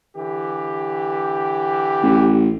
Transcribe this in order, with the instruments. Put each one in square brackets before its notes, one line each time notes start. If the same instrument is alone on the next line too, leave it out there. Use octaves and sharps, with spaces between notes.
[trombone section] D3 E3 G4
[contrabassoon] A1